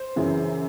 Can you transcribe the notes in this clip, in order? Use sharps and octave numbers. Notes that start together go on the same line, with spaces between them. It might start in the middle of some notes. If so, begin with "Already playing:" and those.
Already playing: C5
F#2 C#3 E3